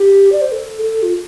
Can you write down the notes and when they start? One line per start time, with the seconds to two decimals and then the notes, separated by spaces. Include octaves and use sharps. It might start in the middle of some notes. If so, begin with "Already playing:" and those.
Already playing: G4
0.32 D5
0.41 C5
0.52 A4
0.82 A4
1.03 F4